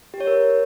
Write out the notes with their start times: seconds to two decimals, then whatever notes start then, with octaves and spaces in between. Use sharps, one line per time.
0.14 G4
0.20 C#5
0.27 A#4